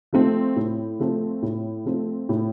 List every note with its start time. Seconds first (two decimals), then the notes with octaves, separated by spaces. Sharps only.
0.13 F3 A3 C4
0.56 A2
1.00 F3 A3 C4
1.42 A2
1.85 F3 A3 C4
2.29 A2